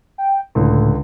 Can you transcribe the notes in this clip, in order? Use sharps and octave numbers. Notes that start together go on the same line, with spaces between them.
G5
C#2 A2 D3